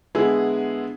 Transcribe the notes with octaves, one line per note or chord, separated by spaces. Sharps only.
D3 G#3 B3 E4 G#4